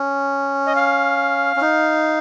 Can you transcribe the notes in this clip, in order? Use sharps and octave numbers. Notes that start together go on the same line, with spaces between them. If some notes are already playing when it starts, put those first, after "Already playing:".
Already playing: C#4
D#5
F5
C#4
D#4